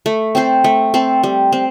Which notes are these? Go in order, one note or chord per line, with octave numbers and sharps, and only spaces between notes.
A3
C4 A4 C5
A3
C4 A4 C5
G3
C4